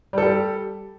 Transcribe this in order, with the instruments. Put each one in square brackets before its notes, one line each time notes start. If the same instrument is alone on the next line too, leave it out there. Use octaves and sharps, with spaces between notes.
[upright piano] G3
A4
G4